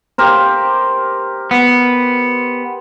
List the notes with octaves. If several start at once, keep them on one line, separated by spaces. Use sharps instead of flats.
G4 A#4 C5
B3